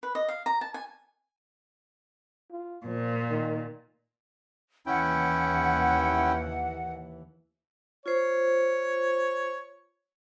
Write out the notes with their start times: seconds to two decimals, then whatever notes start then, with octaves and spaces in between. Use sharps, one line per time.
0.03 B4
0.15 D#5
0.28 F5
0.46 A#5
0.61 A5
0.74 G#5
2.52 F4
2.86 A#2 F3
3.30 D#3
4.87 D#2 E3 C#4 E4 F#5 G5
8.06 F4 C5 C#5